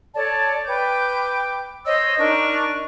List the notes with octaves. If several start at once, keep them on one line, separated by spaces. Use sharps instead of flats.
A4 C#5 D5 A5
B4 G5 D6 G6
C5 C#5 D#5 E6
D4 D#4 A#4 C#6